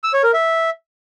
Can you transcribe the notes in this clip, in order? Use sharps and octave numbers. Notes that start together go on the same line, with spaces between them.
E6
C#5
A#4
E5